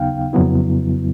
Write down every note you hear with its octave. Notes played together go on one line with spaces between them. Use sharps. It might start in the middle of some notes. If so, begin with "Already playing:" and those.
Already playing: D#2 C#3 F#3 B3 D#4 F5 G5
F2 C#3 F#3 B3 E4